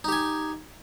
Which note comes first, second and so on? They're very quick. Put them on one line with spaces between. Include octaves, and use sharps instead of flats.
D#4 G4 G#5